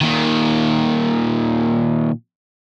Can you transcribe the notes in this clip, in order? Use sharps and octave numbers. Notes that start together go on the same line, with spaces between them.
A#2 D#3